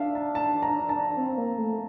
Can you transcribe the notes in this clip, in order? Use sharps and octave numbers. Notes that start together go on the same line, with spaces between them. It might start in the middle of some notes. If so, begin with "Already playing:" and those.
Already playing: D4 E5 F5
A5
A5
A#5
A5
C4
A#3
A3